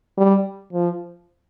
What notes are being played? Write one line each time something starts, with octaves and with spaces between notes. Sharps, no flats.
G3
F3